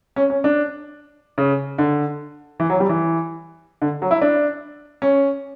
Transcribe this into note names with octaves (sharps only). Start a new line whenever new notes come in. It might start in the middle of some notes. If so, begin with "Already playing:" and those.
C#4
C#4
D4
C#3
D3
E3
F#3
G3
E3
D3
F#3
E4
D4
C#4